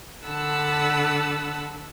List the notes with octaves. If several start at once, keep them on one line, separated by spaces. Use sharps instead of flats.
D3 F#5 A5 B5 E6